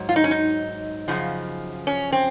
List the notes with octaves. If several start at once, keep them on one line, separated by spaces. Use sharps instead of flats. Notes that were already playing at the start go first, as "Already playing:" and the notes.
Already playing: G#2 F#3
F4
D#4
C#4
D#4
F#2 C#3 F3
C#4
C4